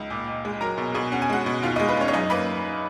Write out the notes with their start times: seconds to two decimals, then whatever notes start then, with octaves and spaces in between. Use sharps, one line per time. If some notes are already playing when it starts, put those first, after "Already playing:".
Already playing: C#2 D#4
0.10 A#2
0.27 A#2
0.45 G#3
0.61 F#3 A#4 A#5
0.78 B2
0.94 B2 G#4 G#5
1.12 C#4 F#5
1.22 G#5
1.30 G#3 F#4 F#5
1.46 B2
1.63 D#2 F4 F5
1.76 G#3 D#4 D#5
1.88 B4
1.97 G#3 C#4 C#5
2.08 C#5
2.13 F#2 D#4 D#5
2.30 A#3 B4 B5